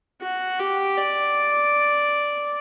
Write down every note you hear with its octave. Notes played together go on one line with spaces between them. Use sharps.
F#4
G4
D5